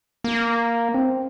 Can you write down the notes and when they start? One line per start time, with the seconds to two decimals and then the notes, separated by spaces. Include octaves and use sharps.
0.24 A#3
0.94 C4